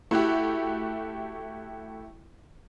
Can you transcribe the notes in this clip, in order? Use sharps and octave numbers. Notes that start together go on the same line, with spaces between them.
A3 E4 F#4 G4